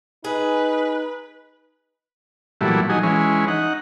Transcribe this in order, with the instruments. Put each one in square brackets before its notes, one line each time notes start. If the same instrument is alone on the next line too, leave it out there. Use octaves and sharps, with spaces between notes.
[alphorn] D#4 [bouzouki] G#4 [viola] B4
[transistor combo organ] A#2 E3 F#3 G3 A3
F#3 D#4 G#4
E3 G#3 C#4
D#4 F#5